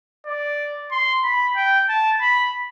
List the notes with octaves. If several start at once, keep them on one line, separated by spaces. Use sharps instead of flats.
D5
C6
B5
G5
A5
B5